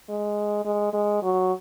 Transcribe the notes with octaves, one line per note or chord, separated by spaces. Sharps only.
G#3
G#3
G#3
F#3